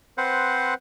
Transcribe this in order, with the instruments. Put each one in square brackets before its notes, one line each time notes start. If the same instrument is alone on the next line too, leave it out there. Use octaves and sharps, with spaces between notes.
[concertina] C4 B4 C5 F#5